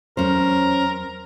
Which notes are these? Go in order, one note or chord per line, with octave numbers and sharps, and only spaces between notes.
E2 F#3 C#4 A#4 C5